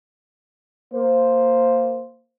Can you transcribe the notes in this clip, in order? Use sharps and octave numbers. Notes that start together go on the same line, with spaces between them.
A#3 C5